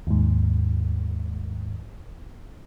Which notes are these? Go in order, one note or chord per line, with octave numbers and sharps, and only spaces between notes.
D#2 G#2